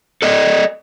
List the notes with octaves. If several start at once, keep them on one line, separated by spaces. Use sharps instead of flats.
A4 D5 D#5